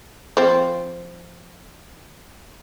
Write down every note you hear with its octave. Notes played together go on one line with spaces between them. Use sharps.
F3 C4